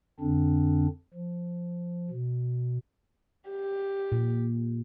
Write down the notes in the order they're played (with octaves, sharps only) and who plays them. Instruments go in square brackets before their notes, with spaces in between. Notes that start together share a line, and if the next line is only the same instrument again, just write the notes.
[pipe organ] F2 D3 C4 D4
F3
B2
[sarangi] G4
[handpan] A#2